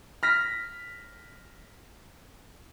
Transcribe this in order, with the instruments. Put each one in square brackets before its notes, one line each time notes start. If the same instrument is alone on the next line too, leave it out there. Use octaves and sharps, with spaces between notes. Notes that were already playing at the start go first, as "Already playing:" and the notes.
[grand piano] F6 A#6 B6